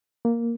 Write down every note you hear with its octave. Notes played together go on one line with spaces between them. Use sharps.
A#3